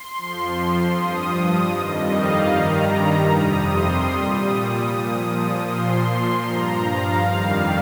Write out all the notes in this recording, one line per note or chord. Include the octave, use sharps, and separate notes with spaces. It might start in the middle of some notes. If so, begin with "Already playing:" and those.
Already playing: C6
F2 F3
G2 F3 D#6
D#6
F2 D#3 G3 D#5
F5
G2 D#3 G3 A#5
F2 C3 G3 D#6
C6
A#2 G3 D#6
A#2 F3
A#2 F3 C6
G2 F3 A#5
F5
F2 D#3 G3 F5